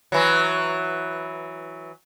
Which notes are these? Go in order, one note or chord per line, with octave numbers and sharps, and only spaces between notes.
E3 F#3